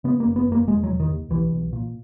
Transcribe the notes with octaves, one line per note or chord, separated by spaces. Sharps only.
C#3 B3
A#3
F#1
B3
F#1 A#3
E1 G#3
F#3
E1
D#3
D#2
B1 E3
B1
A#2